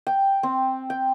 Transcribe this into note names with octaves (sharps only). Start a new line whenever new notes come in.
G5
C4
G5